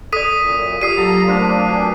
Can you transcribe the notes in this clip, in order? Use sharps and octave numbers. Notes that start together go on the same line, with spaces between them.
A4 D5 D#6 B6 D#7
F#2 A#2
F4 G4 D5 D#6 C7 D#7
F#3 A#3 G4 A4 F#5 A#5
A3 A#3 C4 D4 A#4 C5 F5 C6
F#4 B4 G#5